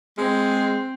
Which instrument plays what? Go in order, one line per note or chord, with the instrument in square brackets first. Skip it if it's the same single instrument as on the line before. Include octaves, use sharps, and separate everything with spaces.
[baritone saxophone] G#3 [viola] C4